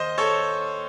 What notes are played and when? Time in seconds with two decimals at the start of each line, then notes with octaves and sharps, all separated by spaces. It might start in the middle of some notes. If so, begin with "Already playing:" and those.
Already playing: D#2 D#3 C5 D#5
0.18 A4 C#5